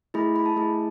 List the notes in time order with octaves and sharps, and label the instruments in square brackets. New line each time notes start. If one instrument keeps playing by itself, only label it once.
[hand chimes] A3 E4 G#4 B5
B5
A5
A3 E4 G#4